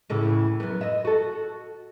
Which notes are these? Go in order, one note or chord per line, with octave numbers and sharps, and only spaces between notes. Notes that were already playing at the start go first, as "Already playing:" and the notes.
A2 C#3 E3
F#2 B3
D#5 E5
F#4 A4